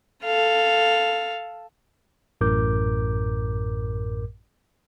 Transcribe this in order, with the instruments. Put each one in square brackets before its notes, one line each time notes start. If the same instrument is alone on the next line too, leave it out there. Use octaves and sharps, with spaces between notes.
[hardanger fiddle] A4 F5
[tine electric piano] A1 F#2 A2 A#4 D6 G6